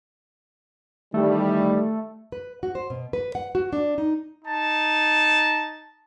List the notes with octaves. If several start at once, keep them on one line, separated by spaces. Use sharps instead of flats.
D#3 E3 G3 A3
B4
F#4
C5
B2
B4
F#5
F#4
D4
D#4
D#4 A5